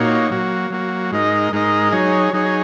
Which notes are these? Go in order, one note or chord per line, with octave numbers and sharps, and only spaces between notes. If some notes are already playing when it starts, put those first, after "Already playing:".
Already playing: A#2 A#3 D#4 F#4 C#5
F#3 A#3 F#4
F#3 A#3 F#4
G#2 G#3 D#4 A#4 D#5
G#2 G#3 D#4 A#4 D#5
F#3 D#4 G#4 C#5
F#3 D#4 G#4 C#5